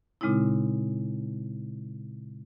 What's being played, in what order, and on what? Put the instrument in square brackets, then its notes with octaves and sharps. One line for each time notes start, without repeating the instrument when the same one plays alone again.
[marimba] A#2 C#3 G#3 C4 D#4 E4